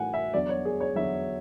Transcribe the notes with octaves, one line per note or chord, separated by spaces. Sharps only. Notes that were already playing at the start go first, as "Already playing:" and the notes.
Already playing: A2 E3 F#5 G#5
E5
E2 D3 F#3 D5
C#5
G#4
C#5
E2 D3 F#3 E5